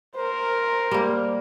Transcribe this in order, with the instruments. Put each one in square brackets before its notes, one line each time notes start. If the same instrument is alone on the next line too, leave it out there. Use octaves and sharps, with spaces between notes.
[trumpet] A#4 [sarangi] C5
[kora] G3 A#3